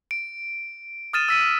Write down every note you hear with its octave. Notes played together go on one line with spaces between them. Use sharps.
D7
D#6 F6 A6 D#7 E7
E6 B6 D#7